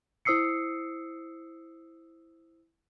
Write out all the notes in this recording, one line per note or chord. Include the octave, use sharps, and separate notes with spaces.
E4 C5 D#6 E6 C7 C#7